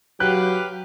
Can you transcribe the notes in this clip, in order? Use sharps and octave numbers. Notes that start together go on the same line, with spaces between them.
F#3 G4 B4 F5 F#6